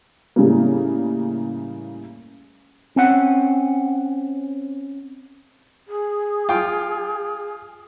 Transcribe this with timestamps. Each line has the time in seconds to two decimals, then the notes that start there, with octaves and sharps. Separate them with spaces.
0.36 A2 C#3 G3 A#3
2.96 C4 C#4 F#5
5.87 G#4
6.49 F4 G5